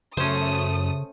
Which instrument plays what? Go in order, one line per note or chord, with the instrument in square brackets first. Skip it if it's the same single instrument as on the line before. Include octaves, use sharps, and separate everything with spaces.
[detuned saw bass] F#2 [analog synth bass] C#3 [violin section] A3 D#6 [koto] C#4 C5